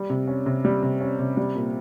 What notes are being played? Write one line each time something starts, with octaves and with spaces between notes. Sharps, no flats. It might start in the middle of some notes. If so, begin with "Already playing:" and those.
Already playing: G3
C3
C#4
C3
G3
C3
C#4
C3
G3
A#2